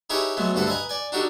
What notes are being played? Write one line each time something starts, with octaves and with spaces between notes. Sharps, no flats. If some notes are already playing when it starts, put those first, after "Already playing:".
D#4 E4 G4 G#4 B4 C#5
F#3 G#3 A3 B3
D2 G2 C4 A4 B4 F#5
B4 D#5 G#5 A#5
D5 G#5
D4 D#4 F#4 G4 A4 A#4